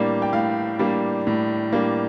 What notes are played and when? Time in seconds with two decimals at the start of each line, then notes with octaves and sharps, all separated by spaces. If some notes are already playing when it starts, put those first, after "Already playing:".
Already playing: A2 G3 A#3 D4
0.22 G5
0.33 A2 F5
0.79 G3 A#3 D4
1.27 A2
1.73 G3 A#3 D4